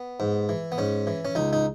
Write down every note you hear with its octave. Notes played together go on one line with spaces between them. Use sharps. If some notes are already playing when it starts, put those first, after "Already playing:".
Already playing: B3
G#2
E3
B3
G#2 C#4
E3
C#4
C#2 D#4
D#4